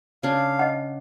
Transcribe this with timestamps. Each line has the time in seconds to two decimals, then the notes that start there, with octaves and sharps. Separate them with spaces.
0.23 C#3 D4 F5
0.59 D#5 F#5